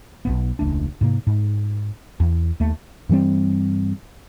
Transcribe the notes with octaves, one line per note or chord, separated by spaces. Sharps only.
B1 E2 B3
E1 C#2 A3 D4
G#2 C3 A#3
G#2
E2
D#2 A3
G2 E3 G3 C4